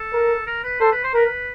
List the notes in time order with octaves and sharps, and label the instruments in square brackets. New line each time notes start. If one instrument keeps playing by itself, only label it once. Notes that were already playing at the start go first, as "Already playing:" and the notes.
Already playing: [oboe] A4
[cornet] A#4
[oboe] A#4
B4
[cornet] A4 [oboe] C5
[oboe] B4
C5
[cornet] A#4 [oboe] B4